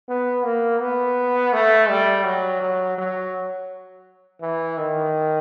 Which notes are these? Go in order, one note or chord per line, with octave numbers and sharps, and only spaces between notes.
B3
A#3
B3
A3
G3
F#3
F#3
F#3
E3
D#3